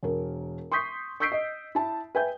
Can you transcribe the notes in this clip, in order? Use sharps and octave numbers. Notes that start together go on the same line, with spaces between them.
E1 A#4
C6 C#6 D#6 G6 B6 C7
C#6 E6 G6 B6 C7 D7
D#5
E4 A5
B4 E5 G5 G#5 G6